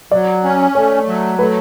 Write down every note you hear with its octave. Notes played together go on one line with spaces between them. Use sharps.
F#3 D5
C#4
A3 C#5
F#3
A3 B4